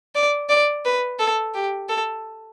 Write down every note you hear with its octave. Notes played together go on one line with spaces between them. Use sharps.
D5
D5
B4
A4
G4
A4